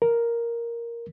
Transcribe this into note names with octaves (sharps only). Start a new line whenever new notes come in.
A#4